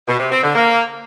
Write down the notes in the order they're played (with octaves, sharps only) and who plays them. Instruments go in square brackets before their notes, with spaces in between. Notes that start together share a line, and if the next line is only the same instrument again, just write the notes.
[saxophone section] B2
C3
C4
D3
A#3